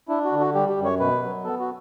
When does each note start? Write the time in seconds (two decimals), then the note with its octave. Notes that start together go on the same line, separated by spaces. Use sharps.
0.09 D4 E4
0.25 F#4
0.32 D3
0.40 F#4
0.54 G3 G4
0.69 G4
0.77 F#2
0.84 C#5
0.99 B2 B4
1.22 F#3
1.44 B3 A4
1.60 F#4